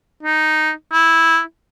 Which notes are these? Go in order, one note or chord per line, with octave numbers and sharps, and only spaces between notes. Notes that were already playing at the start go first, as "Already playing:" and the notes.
D#4
E4